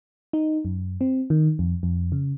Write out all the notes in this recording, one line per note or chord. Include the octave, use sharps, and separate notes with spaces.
D#4
F#2
C4
D#3
F2
F2
C#3